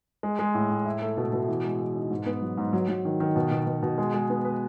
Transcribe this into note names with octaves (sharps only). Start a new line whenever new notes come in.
G#3
G#3
A2
A2
E4
A3
B2
B2
E3
G#3
E3
D#4
G#2
B3
F#3
G#2
F#3
F#3
D#3
D#3
B2
B2
B2
B2
G#3
G#3
B3
B4